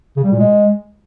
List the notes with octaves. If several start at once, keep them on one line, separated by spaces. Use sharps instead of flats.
C#3
G3
A#2
G#3